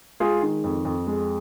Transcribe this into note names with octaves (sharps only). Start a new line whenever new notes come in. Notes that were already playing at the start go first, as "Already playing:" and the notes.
G#3 F4 G#4
D#3
F2
F2
G#3